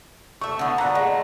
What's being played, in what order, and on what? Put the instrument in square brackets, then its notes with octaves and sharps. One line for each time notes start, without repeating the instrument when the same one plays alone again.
[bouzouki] A3 E5 [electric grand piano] C#6
[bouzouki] D3 B3
[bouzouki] A#2 F#5 [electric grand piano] A#5
[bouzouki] G#3 A3